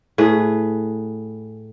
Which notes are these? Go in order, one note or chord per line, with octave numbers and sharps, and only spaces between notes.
A2 G#4 B4